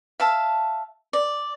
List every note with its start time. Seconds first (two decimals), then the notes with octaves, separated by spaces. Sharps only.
0.20 E5 F5 A5
1.13 D5